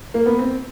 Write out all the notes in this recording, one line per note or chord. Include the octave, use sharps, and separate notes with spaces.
A#3
B3
C4